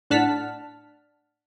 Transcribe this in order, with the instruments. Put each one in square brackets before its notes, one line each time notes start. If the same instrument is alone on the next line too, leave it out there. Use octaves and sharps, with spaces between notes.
[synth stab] A2 D4 F#5 A5 F6 B6